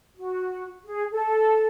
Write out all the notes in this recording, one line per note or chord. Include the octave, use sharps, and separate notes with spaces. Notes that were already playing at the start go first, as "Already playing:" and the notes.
F#4
G#4
A4